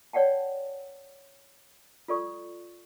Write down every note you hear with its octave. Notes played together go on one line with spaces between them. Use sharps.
C#5 D5 F#5 G5 A5
F4 A4 D5 C#6 D#6